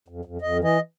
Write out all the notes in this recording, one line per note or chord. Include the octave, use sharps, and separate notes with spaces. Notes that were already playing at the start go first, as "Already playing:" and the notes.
F2
F2
F2 D#5
E3
D#5